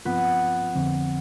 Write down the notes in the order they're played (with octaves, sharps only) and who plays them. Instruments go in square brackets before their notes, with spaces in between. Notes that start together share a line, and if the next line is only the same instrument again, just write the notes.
[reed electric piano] G2 F3 C4 F4 [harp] B3
[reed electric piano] F2 D3 F3 C4